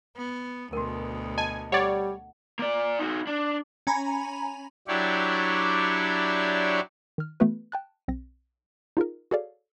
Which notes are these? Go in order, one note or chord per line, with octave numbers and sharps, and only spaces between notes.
B3
D2 B2 F#4 A#4
D#5 G#5 A5
G3 C#5 D5 F#5
A#3 D5
D#4 F#4
D4
C#4 G#5 A#5 B5
F#3 D4 E4 G4 C#5 D5
D#3 F6
E3 A3 B3 F#4 B4
G5 A5 F#6
B1 C4 A#6
D#4 F4 G#4 A#4
F#4 G#4 A4 C#5 D5 F5